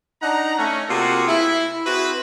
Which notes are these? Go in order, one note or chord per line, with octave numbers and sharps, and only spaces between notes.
D4 D#4 F#5 A#5
A3 C#4
C3 A#3 F4 F#4 G#4 A4
E4
C4 E4 F#4 G#4 B4